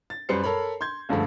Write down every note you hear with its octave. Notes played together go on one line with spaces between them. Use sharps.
A6
F#2 G3 B4 C5 C7 C#7
A4 A#4 C#5 B5
C6 G6 G#6
C#2 G2 D3 F3 A3